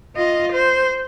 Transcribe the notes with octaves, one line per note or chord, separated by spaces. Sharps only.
F4 D#5
C5